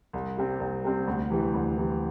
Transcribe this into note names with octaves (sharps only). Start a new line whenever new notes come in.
C2
C3 G3 C4
C2
C3 G3 C4
D2
C3 E3 G3
D2
C3 E3 G3